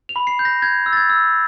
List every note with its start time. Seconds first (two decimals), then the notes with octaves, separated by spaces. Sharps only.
0.09 F7
0.16 B5
0.27 C7
0.39 G6
0.45 A#6
0.62 G6 G#6
0.86 E6
0.93 A6
0.97 G#6
1.10 E6